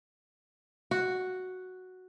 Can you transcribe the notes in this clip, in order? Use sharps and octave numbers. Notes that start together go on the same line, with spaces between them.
F#4